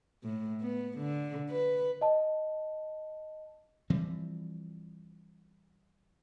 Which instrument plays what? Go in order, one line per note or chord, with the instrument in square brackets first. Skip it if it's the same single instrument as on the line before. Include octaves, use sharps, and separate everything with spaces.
[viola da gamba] A2
B3
D3
B4
[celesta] D#5 A5
[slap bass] E3 F3 G3 C4